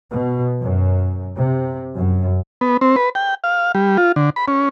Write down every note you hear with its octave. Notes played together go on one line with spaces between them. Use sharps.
B2
F#2
C3
F#2
B3
C4
B4
G5
F5
G3
F4
D3
B5
C#4